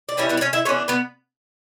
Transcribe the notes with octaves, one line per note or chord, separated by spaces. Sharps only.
D5
E3 G3 C#4 E4 C#5
B3 B4
D5
C#4 C#5
E4 E5
E3 B3 C#4 D4 C#5
B3 B4